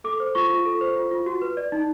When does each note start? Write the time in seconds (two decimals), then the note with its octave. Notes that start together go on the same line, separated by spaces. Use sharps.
0.04 A4 D6
0.20 C5
0.35 F4 C#6
0.50 F4
0.65 A4
0.81 C5
0.96 F4
1.11 F4
1.26 F#4
1.42 B4
1.57 D5
1.72 D#4